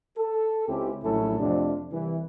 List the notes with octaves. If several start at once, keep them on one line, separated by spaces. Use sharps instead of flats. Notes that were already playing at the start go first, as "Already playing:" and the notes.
A4
C#2 C4 C#4 E4 G4
A#1 A2 F#3 C#4 E4 A4
F2 C3 A3 D4
C2 E3